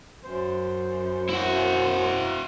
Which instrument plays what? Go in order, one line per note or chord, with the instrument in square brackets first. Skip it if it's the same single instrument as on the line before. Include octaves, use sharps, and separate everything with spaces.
[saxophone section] F#2 C5
[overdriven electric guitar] E4 F#4